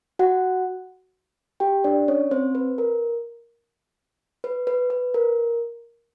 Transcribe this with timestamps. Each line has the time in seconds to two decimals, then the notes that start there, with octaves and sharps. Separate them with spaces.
0.19 F#4 F#5
1.60 G4 G5
1.84 D4 D5
2.08 C#4 C#5
2.31 C4 C5
2.55 B4
2.78 A#4
4.44 B4
4.67 B4
4.90 B4
5.14 A#4